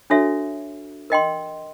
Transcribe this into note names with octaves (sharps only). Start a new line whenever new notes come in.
D4 F#4 A4 C#5 E5
A#4 D#5 G5 C6